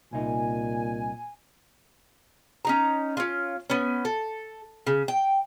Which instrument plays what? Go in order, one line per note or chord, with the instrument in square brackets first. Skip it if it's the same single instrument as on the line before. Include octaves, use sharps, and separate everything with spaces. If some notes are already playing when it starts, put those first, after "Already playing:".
[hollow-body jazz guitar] C2 D#4 [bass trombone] A#2 [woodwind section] G#5
[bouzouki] C#4 D#4 A#5
C#4 F4
B3 C#4
A4
C#3
G5